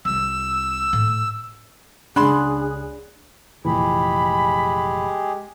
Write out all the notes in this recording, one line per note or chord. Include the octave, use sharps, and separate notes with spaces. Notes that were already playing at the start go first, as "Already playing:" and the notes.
C2 F4 E6
A2
C#2 F#3 D4 G#4 B5 C6 F#6
F1 A#2 E3 G#3 G4 G#4 B5